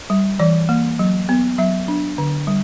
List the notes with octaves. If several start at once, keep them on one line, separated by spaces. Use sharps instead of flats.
G3
E3 D5
A#3
F#3
B3
F#3 E5
D4
D3
G3